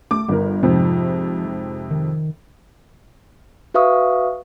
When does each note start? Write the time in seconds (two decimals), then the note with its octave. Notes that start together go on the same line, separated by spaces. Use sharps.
0.11 A3 D6
0.28 G1 G3 A#4
0.63 F2 G#2 C3 F3
1.91 D#3
3.74 F#4 B4 E5 F5 C#6 D#6